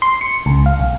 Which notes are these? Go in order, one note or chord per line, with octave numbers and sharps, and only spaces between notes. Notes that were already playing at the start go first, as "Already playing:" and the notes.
C6
C#7
C#2
F5
B1